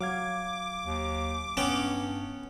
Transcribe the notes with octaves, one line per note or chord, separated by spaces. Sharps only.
F#3 F5 D6 G#6
D#2
G2 B3 C#4 G5